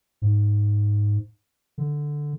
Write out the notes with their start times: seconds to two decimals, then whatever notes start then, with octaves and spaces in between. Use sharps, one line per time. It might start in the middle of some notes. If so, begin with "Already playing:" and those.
0.22 G#2
1.78 D3